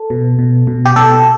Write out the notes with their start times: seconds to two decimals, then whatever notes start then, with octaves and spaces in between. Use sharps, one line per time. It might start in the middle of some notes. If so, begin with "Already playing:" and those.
Already playing: A4
0.10 B2
0.39 B2
0.67 B2
0.85 G4
0.96 B2 A4